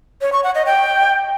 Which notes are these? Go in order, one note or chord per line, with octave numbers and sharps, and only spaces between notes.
C#5
C#6
F#5
D#5
G5